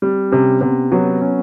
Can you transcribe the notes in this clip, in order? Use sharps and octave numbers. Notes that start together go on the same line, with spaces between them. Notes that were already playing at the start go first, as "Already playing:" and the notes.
G3 C4
C3 C#4
C3 B3
F#3 B3
C#4